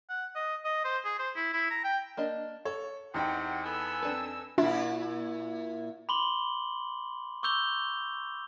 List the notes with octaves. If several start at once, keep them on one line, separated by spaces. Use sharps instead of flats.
F#5
D#5
D#5
C5
G#4
C5
E4
E4
A#5
G5
A#3 D4 D#5
A4 C#5
E2 C3 D#4 F#5 G5
B3 A4 G#5 E6
C4 D4 B4
A#2 D4 E4 F4 E5
B5 C6 D6 F#7 G7
C#6 D6 E6 G6 F7 G7